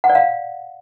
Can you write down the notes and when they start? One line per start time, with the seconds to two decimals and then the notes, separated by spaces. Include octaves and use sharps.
0.04 F#5
0.10 D5
0.15 F5